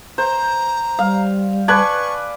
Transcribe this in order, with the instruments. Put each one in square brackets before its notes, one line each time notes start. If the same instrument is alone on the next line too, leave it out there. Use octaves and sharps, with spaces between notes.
[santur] C5 [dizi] A#5
[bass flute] G3 [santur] F5
[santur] B4 D5 G#5 [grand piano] A5 F#6 [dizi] C#6